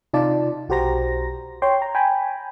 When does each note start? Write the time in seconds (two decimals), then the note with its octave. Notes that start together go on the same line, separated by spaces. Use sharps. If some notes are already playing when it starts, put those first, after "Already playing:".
0.13 C3 D#4 F4 D5 A5
0.69 B1 F#4 G4 C5 A#5 A#6
1.62 C#5 G5 C6
1.82 A#5
1.95 G5 G#5 B5